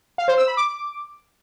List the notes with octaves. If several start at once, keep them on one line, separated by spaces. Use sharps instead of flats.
F5
C5
E6
B5
D6